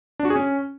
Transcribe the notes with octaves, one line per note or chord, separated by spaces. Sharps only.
D4
F#4
G#4
C#4